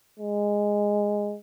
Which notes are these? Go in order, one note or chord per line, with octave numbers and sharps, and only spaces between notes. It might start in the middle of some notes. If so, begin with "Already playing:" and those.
G#3